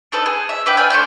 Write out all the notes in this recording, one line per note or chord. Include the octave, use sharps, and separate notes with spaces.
D4 D#4 A4 B4
G#4
E5
D4 B4 E5 G5
D5 F5 G5 G#5
A3 D4 C6 G6